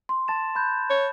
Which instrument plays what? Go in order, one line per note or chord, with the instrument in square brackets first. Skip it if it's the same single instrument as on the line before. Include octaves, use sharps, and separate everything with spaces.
[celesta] C6
[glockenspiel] A5 A6 E7
B5 F#6 G6
[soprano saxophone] C#5